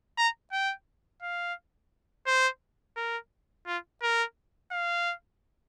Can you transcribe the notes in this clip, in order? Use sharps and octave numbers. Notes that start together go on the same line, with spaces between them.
A#5
G5
F5
C5
A#4
F4
A#4
F5